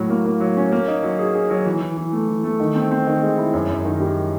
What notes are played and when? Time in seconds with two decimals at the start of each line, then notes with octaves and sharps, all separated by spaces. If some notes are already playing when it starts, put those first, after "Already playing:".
Already playing: A2 F#3
0.09 A#3
0.25 A#3
0.40 F#3
0.57 C#4
0.72 A#3
0.88 D#4
1.03 F#3
1.19 G#4
1.35 G#4
1.50 F#3
1.66 E3
1.81 E3
1.97 E3
2.13 A3
2.28 E3
2.44 A3
2.60 D#3
2.76 C4
2.91 C4
3.07 D#3
3.22 G#3
3.38 E4
3.53 F#2
3.69 F#2
3.85 D#3
4.00 G3